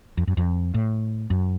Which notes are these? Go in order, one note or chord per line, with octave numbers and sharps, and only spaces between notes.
F2
F#2
F2
A2
F#2